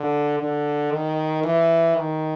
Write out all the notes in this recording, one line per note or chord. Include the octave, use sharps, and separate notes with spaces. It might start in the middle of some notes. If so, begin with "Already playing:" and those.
Already playing: D3
D3
D#3
E3
D#3